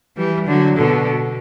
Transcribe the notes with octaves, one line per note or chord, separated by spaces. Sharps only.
E3 G3
D3 F#3
B2 D3